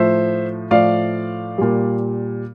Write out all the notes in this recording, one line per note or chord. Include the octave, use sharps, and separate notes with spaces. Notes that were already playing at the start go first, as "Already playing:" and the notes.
Already playing: A2 F3 C5 E5
A2 F3 D5 F5
A#2 G3